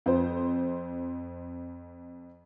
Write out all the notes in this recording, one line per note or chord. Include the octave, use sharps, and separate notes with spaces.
F2 C5